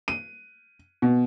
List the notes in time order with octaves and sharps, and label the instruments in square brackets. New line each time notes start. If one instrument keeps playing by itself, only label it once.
[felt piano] D#7
B2